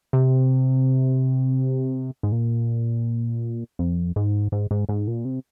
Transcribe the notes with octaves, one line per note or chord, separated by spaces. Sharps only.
C3
G#2
A#2
F2
G#2
G#2
G#2
G#2
A#2
C3